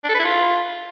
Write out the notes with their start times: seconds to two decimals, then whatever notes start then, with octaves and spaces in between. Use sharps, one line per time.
0.04 D4
0.09 A4
0.14 B4
0.19 E4
0.24 F4